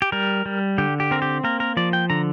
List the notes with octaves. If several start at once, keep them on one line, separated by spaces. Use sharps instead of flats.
G4
G3 A#4
G3
D3 G4
G4
C4 A#4
G4
A#3 A#4
A#4
F3 D5
G5
D3 A#5